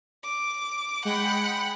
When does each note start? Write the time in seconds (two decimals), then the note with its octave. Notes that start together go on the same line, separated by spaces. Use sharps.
0.24 D6
1.05 G#3 F#5 G5 B5